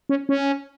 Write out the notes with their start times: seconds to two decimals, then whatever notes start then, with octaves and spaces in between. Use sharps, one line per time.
0.09 C#4
0.29 C#4